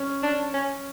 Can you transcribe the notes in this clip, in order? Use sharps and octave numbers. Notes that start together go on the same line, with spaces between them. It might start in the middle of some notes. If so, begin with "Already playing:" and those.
Already playing: C#4
D4
C#4